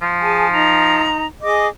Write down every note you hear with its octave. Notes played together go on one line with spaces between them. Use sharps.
F3
G#4 G#5 A5
D#4 A#5
G#4 D#5 D6